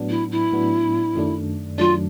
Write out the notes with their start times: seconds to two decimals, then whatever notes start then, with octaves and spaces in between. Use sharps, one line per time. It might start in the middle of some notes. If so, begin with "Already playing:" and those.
Already playing: A2 F#3 B3 D4
0.10 E4
0.31 E4
0.52 A2 F#3 B3 D4
1.15 F#2 D#3 F#3 A3 D4
1.78 F#2 D#3 F#3 A3 D4 F4